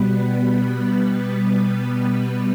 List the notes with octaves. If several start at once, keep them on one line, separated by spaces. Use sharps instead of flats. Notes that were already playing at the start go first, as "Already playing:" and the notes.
Already playing: B2 G3 B3 B4